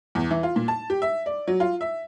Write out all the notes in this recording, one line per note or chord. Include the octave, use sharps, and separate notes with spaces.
E2
E3
F4
A#2
A5
G4
E5
D5
F#3
F4
E5